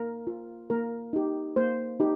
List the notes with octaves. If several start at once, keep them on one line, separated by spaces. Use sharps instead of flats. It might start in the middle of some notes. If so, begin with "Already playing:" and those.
Already playing: A#3 A#4
F4
A#3 A#4
D#4 G4
A#3 C5
D#4 G4